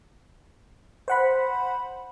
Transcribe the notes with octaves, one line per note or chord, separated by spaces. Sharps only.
C5 F#5 B5